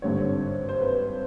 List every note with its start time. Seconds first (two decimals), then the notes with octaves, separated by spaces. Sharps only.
0.02 G#1 G2 D3 G3 C4 C#5
0.69 C5
0.81 B4